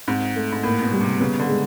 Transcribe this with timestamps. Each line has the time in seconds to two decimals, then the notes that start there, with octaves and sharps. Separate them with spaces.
0.08 G#2 C4
0.36 A3
0.52 G#2
0.63 A2 A#3
0.83 B2
0.92 G3
1.01 C3
1.20 C#3 B3
1.40 D3
1.48 G#3